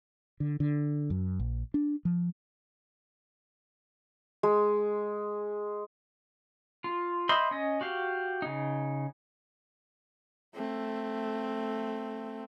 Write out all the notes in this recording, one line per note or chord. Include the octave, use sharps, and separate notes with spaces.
D3
D3
F#2
A#1
D4
F3
G#3
F4
C5 D#5 E5 B5 C6
C#4 D#5
F#4 G4 F5
C#3 D#4
A3 C4